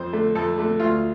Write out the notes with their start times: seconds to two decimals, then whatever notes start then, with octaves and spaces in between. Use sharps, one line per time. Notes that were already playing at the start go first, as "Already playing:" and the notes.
Already playing: F2 C5
0.13 D3 A3
0.35 F2 A4
0.58 D3 A3
0.80 D2 F4